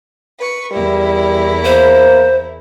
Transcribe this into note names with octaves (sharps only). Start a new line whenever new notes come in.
B4 C#6
E2 G3 E4 A#4
A#3 C5